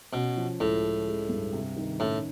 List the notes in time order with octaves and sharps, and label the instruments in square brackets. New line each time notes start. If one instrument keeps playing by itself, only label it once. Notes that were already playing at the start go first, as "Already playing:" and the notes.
[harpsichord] B2 [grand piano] C#4
[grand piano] F3
[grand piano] C#2 [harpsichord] A2
[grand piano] C#3
G#3
G2
C3
D#3
[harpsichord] A2 [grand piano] C#4